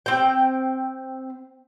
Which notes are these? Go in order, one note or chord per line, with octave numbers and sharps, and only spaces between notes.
C4 G5